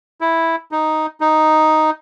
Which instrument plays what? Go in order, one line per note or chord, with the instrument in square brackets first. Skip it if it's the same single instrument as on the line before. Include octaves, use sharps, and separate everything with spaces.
[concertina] E4
D#4
D#4